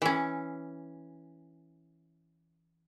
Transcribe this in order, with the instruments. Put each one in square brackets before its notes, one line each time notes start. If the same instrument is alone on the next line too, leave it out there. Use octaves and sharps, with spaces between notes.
[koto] E3 C#4